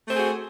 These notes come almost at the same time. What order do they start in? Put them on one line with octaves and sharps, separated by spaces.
A3 C4 G#4 F#4